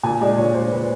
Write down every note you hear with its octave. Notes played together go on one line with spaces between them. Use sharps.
A#2 G#5
G#3 D5
A#2 C#5
A#2 C5
A#2 B4